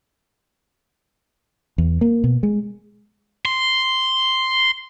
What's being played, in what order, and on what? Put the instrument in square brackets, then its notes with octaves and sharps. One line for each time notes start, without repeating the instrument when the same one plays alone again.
[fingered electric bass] E2
A#3
B2
G#3
[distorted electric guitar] C6